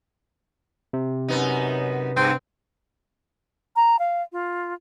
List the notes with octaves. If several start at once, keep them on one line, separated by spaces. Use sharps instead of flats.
C3
F#2 B3 D#4
G2 C4
A#5
F5
F4